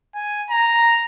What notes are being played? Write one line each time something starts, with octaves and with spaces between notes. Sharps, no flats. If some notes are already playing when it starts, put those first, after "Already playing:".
G#5
A#5